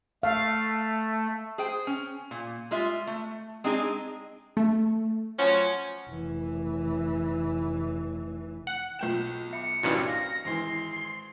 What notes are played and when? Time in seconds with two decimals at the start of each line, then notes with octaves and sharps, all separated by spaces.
0.23 A3 F5
1.58 G#4 C5 G5
1.87 C#4
2.31 A#2
2.71 G3 G#3 F4 E5
3.07 A3
3.64 G#3 C4 D4 D#4 G#4
4.57 A3
5.38 F3 F#3 C#4
6.10 F1 E3
8.67 F#5
8.99 B1 F4 B4 G5 G6 E7
9.53 E5 B5 D6 C#7
9.83 C2 G2 A#2 E3 C#4 D#4 F#4 A#5
10.08 F5 E6 A#6
10.45 G#1 E3 C6